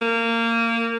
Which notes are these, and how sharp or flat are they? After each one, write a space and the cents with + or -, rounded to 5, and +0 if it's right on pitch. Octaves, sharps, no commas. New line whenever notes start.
A#3 -20